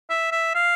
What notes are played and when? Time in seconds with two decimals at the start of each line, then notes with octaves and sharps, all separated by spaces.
0.10 E5
0.32 E5
0.55 F5